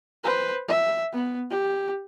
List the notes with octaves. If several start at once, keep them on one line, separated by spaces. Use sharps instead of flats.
B4 C5
E5
B3
G4